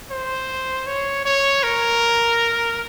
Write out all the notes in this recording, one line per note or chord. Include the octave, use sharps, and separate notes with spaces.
C5
C#5
C#5
A#4